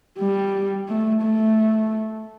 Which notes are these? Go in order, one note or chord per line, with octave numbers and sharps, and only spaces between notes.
G3
A3
A3